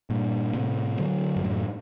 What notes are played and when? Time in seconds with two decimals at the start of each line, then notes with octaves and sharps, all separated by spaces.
0.10 G2 A#2
0.54 A2 C3
0.99 D3 F#3
1.36 G2
1.44 F#2 A2